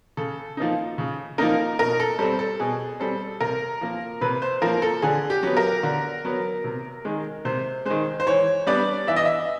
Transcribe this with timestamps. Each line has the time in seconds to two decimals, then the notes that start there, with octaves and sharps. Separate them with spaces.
0.17 C#3 A4
0.57 F3 A#3 D#4
0.98 C#3
1.38 F3 A#3 D#4 A#4
1.79 B2 A#4
2.00 A4
2.19 G3 C4 A4
2.39 A4
2.60 B2 G#4
3.00 G3 C4 A4
3.41 C3 A#4
3.81 F3 A#3
4.21 C3 B4
4.42 C5
4.62 F3 A#3 A#4
4.82 A4
5.02 D3 G#4
5.30 G4
5.43 F#3 B3
5.57 A#4
5.83 D3
6.25 F#3 B3
6.64 C3
7.05 D#3 G#3
7.45 C3 C5
7.86 D#3 G#3 C5
8.20 C5
8.27 E3 C#5
8.67 G3 B3 D4 D5
9.07 E3 E5
9.16 D#5
9.25 E5